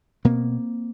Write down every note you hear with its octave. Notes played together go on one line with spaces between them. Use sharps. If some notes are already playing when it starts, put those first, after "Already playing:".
B2 A#3 C4